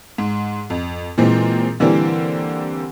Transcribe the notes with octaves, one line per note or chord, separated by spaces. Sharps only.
G#2
F2
A#2 E3 G#3 C4
D3 E3 G3 A#3 C4